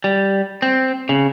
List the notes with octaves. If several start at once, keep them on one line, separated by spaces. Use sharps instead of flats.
G3
C4
C#3